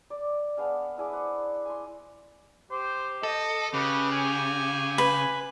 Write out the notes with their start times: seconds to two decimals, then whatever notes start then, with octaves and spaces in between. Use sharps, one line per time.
0.10 D5
0.57 B3 D4 G#4 F5
0.96 D4 E4 G#4 D6
1.13 C5 F#5
1.65 G#5 C6
2.71 G4 C5
3.23 A4 D#5
3.74 C#3 G4 B4
4.12 G#5
4.98 B4